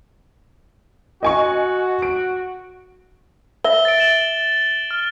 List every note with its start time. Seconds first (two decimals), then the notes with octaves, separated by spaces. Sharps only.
1.23 F#4 D#5 G#5 C#6
2.02 D7
3.64 A#4 E5 G7
3.85 A6 D7
3.99 A6 E7 F#7
4.91 F6